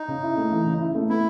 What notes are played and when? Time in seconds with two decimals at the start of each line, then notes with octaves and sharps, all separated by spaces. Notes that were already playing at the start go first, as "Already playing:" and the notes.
Already playing: D#4
0.08 C#3
0.23 E4
0.37 A3
0.52 E3
0.66 C#3
0.80 E4
0.95 A3
1.09 B3 E4